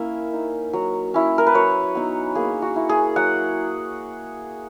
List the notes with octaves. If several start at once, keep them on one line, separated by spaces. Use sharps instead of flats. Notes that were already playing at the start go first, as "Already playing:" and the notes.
Already playing: A#3 C#4 E4 E5
D#4
F#3
C#4 E4
A#4
B4
F#3 C#5
B3 D#4
A#3 G#4
F#4
E4
G#4
F#3 F#5